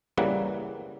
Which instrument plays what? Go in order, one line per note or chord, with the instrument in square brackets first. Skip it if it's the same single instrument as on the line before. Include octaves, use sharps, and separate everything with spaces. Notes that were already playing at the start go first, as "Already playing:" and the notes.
[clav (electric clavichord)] C#3 E3 G3 A#3 F#5